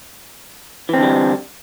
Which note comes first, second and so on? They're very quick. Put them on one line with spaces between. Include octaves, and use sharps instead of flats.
E3 C4 D3 G3